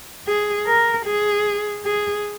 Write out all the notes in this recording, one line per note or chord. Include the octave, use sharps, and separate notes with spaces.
G#4
A#4
G#4
G#4